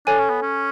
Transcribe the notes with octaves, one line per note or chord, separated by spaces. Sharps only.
D4 A4 C#5 G#5
C#4
B3
C#4